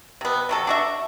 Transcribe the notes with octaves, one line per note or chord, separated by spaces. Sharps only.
C3 B3
C3 F#3 A4
D4 F#4 E5